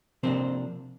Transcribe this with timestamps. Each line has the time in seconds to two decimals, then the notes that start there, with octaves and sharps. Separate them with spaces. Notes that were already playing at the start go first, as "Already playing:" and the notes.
0.23 C3 F3 A#3 C4 D4 C5